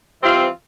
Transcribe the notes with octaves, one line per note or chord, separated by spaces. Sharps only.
E3 G3 C4 F4